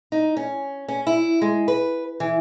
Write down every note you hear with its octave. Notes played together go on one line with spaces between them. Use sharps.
D#4
C#4
C#4
E4
G#3
B4
E3